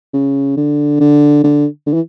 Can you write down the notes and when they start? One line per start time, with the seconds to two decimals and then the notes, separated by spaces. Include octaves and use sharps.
0.13 C#3
0.57 D3
1.00 D3
1.43 D3
1.86 D3
1.94 E3